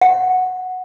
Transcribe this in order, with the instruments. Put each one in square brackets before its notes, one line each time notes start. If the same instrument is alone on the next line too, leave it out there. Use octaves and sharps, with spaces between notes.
[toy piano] F#5